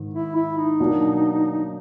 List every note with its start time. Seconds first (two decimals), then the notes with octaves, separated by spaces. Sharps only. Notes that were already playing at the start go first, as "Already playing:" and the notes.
Already playing: G#2 D#3 G#3
0.14 E4
0.35 E4
0.58 D#4
0.80 B2 F#3 A#3 D4